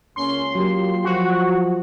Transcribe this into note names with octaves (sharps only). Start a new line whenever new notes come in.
C#2 A#3 C#4 C6
F#3 A#3 F4 G4
F3 F#4